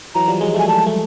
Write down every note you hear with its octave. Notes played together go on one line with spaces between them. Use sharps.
E3 F#3 A#5
F3 G3
F#3 G#3
G3 A3 G#5
G3 A3 A5
A3